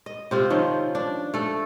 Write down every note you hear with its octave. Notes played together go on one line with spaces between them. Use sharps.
D#5
C3 C4 F4
D#3 F3 C#4
D4
A3 A4